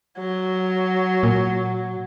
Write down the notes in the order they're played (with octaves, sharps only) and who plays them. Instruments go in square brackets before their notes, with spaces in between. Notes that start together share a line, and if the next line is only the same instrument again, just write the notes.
[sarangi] F#3
[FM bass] A#2